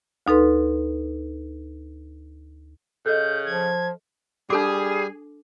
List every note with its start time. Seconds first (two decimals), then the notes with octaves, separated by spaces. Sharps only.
0.27 D2 D#4 A4 B4 C6
3.06 C#3 A4 D#5 G6
3.46 F3 G#6
4.50 G3 D4 G#4 A4 D6